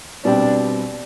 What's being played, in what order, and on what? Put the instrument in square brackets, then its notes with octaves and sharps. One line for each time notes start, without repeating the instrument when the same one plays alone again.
[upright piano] B2 G3 C4 G4 [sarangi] D4